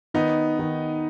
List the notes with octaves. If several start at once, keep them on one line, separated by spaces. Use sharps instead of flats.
D#3 B3 D#4
D#3